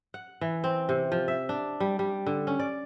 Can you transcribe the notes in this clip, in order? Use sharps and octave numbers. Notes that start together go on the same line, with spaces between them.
F#5
E3
C4
C3
F3
E5
D4
G3
G3
D3
C#4
D5